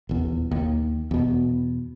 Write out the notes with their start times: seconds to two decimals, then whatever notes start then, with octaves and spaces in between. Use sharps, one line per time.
0.09 D#1 E2
0.51 D#2
1.11 E2 B2